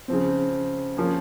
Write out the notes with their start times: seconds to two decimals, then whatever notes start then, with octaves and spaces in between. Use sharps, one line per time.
0.08 C#3 F3 C4
0.97 F3 A#3 C#4